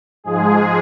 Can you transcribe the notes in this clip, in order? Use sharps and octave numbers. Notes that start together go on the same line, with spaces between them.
G#2 F3 G#3 G#4